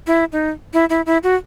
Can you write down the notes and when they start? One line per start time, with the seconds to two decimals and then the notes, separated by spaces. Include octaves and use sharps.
0.07 E4
0.32 D#4
0.73 E4
0.90 E4
1.06 E4
1.23 F#4